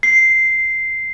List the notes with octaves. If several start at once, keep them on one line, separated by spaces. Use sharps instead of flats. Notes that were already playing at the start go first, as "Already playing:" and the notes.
C7